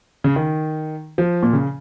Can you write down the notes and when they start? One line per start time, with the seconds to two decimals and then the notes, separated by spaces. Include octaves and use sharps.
0.24 C#3
0.36 D#3
1.18 F3
1.43 A#2
1.53 C#3